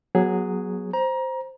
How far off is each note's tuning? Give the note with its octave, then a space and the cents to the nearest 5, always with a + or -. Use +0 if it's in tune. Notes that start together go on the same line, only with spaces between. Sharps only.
F#3 +0 B3 -30 G#4 +0
C5 +0 A#5 +25